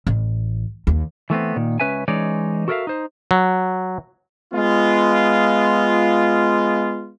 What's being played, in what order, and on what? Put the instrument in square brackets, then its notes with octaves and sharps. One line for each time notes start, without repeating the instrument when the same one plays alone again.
[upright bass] A1
D#2
[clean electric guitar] E3 A3 B3 C4
A#2 D#3
C#2 F3 C#4 B4 E5 G#5
E3 G#3 C#4 D#4 C#5 D5
F#4 A4 A#4 D5 E5 F5
D#4 C5
[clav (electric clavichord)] F#3
[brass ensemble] G#3 B3 F4